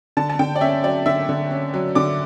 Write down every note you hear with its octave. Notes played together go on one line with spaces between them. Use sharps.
D3 A5
A5
D3 G5
D5
C#4 E5
F#3 D5
D3 E5
D3
C#4
F#3
D3 D6